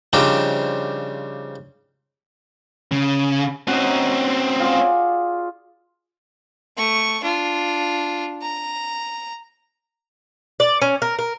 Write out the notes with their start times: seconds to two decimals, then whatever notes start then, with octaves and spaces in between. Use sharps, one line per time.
0.13 C#3 F3 G3 C4 D4 D#4
2.92 C#3
3.68 C4 C#4 D#4 F#4
4.60 F4 G#4 D5
6.77 A3 C#6
7.22 D4 F4
8.42 A#5
10.60 D5
10.82 C#4
11.02 A#4
11.19 A#4